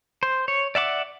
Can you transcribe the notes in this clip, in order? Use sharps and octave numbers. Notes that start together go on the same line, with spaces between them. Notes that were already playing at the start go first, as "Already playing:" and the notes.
C5
C#5
D5 E5 F#5 D6